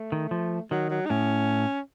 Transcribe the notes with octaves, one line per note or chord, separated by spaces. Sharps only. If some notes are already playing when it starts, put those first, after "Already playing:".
Already playing: A3
D#3
F3
D#3 F#3
F#3
D#4
A2 C#4